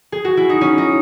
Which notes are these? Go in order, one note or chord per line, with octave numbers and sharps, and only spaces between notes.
G#4
F#4
E4
D#4
C#4
D#4